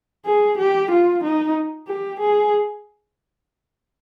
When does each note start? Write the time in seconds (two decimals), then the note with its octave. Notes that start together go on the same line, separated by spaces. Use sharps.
0.26 G#4
0.59 G4
0.91 F4
1.24 D#4
1.88 G4
2.20 G#4